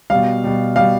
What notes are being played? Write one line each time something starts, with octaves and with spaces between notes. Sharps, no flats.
B2 G3 F5
B2 G3
B2 G3 F5